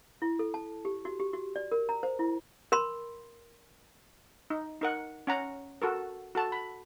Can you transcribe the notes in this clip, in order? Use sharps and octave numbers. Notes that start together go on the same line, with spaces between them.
E4
A4
A5
G4
F#4
G4
F#4
D5
A#4
A#5
C5
E4
A#4 B5 C6
D#4
D#4 A#4 F#5
C#4 F#5 A#5
F#4 A4 A#4
F#4 A4 A5
B5